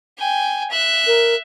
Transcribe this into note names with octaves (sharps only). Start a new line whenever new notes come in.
G5 G#5
E5 F#6
A#4